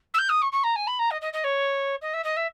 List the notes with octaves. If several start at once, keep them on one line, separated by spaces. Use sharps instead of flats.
E6
G6
D#6
C#6
C#6
A#5
G#5
B5
A#5
D#5
D#5
D#5
C#5
D#5
E5
D#5
E5